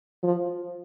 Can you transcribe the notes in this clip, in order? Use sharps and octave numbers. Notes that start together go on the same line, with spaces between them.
F3